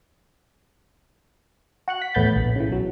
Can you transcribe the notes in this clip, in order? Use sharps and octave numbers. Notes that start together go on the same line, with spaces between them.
F#4 F#5 F#6
B6
E2 A2 B3 B5 G6 A6
A#1
C#3 E3
B1 F#3